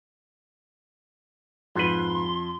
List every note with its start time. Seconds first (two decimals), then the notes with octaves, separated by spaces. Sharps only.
1.75 F2 G#2 B4 C6